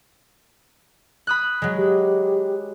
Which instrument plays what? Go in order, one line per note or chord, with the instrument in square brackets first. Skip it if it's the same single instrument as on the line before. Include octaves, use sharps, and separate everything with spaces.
[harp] B5 D#6 F#6
F#3 G#3
[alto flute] G4